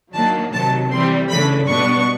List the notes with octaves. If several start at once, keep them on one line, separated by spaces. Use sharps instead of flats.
D#3 F#3 A#3 D4 A5
C3 D#3 F#3 A5
E3 G3 C4 C6
C#3 E3 A3 D4 B5
B2 G3 B3 D4 C#6